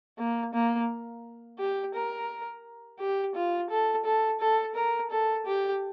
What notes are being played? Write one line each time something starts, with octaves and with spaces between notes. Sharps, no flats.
A#3
A#3
G4
A#4
G4
F4
A4
A4
A4
A#4
A4
G4